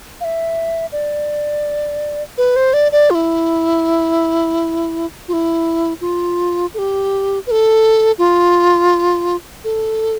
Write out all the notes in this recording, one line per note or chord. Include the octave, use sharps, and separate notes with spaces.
F5
E5
D5
B4
C5
D5
D5
F4
E4
F4
E4
F4
A4
G4
B4
A4
F4
A4